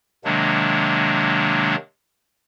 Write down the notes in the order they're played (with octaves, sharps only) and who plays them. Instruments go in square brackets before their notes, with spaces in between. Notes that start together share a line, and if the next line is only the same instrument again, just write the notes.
[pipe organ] C3 D#3 F#3 G#3 A#3 D4